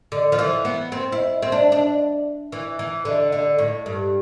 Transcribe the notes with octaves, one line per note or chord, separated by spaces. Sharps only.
D3
F3
E3
B3
C4
E4
C4
D4
D4
E3
E3
D3
D3
A2
G2